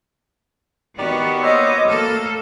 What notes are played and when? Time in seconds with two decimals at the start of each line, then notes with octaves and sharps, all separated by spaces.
0.98 D#3 B3 F#4 G4 D5
1.42 A#3 C5 C#5 D#5 D6 E6
1.86 A3 A#3 A4 F6